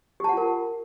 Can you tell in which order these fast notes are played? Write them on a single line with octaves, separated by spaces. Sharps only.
G4 A5 F#5 F4 A#4